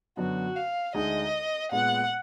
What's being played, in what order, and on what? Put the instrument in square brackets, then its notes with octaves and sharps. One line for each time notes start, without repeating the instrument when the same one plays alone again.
[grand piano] F#2 D3 F#3 B3 [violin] F#4
[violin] F5
[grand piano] D2 D3 G#3 D#4 G#4 [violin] D#5
[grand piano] A#2 G#3 B3 [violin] F#5